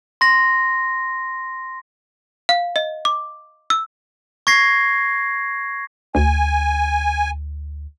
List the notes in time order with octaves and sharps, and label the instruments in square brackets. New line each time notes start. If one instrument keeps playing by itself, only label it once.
[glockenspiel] C6 A#6
[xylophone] F5
D#5
D6
E6
[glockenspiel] C#6 G#6 A#6 C7
[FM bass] D2 [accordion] G#5